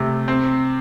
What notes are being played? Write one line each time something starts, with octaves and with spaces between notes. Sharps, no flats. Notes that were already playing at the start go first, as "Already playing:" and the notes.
Already playing: C3 A3
C4